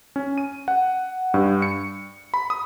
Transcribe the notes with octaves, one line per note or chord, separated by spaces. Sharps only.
C#4
D#7
F#5
G2
C#7
B5
D#6